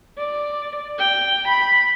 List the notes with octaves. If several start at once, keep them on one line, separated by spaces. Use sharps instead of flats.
D5
G5
B5